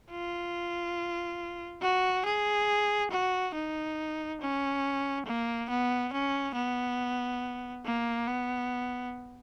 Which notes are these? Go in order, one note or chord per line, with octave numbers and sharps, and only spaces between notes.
F4
F#4
G#4
F#4
D#4
C#4
A#3
B3
C#4
B3
A#3
B3